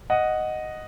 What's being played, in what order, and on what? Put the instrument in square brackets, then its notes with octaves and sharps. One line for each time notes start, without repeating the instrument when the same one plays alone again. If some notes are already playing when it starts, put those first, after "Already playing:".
[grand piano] D#5 F#5